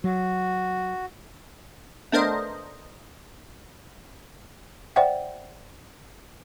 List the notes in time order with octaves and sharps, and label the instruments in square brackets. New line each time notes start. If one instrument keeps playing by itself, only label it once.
[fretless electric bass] F#3 [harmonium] F#4
[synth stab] A3 B3 D4 A#4 C5 D#5
[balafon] C5 D5 E5 F#5 G5